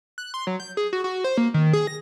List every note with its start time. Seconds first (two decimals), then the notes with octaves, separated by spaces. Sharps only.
0.18 F#6
0.34 C6
0.47 F#3
0.60 G6
0.77 G#4
0.93 F#4
1.04 F#4
1.24 C5
1.37 A#3
1.54 D#3
1.73 G#4
1.87 A#6